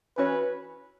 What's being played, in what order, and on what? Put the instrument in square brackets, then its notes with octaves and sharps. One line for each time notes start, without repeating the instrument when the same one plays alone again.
[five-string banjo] E3 C#4 F#4 C#5 [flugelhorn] B4